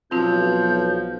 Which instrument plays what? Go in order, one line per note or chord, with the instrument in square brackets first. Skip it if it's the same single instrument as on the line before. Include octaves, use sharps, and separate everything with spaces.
[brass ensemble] B1 [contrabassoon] F3 [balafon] C4 F4 [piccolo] G6